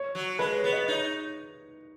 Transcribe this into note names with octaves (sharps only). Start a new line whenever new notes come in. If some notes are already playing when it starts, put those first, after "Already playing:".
Already playing: C#5
F#3
G#3 B4
C#5
B3
D#5
D#4 C#5